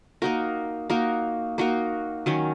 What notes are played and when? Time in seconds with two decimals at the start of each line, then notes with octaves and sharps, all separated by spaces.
0.22 A#3 D#4 F#4 A#4
0.90 A#3 D#4 F#4 A#4
1.58 A#3 D#4 F#4 A#4
2.26 D#3 F#3 C#4